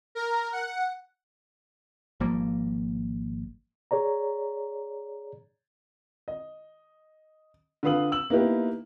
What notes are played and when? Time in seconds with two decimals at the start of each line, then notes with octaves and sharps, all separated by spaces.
0.15 A#4
0.52 F#5
2.20 G#1 F3 G3 A#3
3.91 G#4 C#5 D5 A#5
6.28 D#5
7.83 D3 F4 B4 F5 D#6 F#7
8.12 E6 F#7
8.30 A#3 B3 D#4 E4 G4 B4